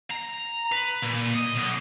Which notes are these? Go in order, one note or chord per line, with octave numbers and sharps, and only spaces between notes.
A#5
B4
A#2
D#5
B1